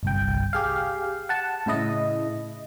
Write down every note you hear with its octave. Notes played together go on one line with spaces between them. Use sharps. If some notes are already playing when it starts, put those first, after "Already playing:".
G1 C2 G5
G4 G#4 F5
F#5 A5
A2 C#3 E4 D#5